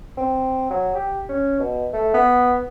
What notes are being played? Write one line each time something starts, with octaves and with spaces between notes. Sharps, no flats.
C4
F#3
G4
C#4
B2
A3
B3